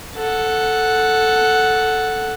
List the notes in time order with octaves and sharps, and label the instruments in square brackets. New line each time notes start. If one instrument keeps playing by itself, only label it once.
[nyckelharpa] A4 F#5